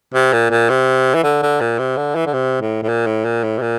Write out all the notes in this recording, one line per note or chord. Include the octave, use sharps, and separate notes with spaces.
C3
A#2
A#2
C3
E3
D3
D3
A#2
C3
D3
E3
D3
C3
A2
A2
A#2
A2
A#2
A2
C3
A#2